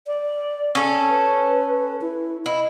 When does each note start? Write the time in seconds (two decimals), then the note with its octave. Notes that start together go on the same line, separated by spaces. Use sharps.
0.07 D5
0.75 C#4 A4
1.10 B4
2.01 E4
2.46 E4 D#5